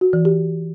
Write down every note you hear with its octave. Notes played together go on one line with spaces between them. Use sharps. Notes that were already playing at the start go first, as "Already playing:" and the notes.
F#4
E3
G4